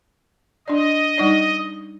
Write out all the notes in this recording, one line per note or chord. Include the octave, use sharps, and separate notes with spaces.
D4 D5 D#5
G3 D#4 D5